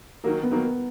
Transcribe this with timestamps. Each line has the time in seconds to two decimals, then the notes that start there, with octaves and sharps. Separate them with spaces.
0.24 D#3 F#3 A#3 A#4
0.43 B3
0.51 D#3 F#3 A#3 A#4